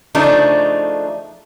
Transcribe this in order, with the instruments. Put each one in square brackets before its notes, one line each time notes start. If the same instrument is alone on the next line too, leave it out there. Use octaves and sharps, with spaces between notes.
[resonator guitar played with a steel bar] C#3 F3 A3 D4 D#4